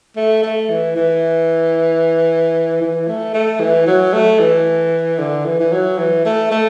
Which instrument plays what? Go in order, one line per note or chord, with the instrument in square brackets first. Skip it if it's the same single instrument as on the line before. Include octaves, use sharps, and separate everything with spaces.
[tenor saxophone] A3
A3
E3
E3
E3
A3
A3
E3
F#3
A3
E3
D3
E3
E3
F#3
E3
A3
A3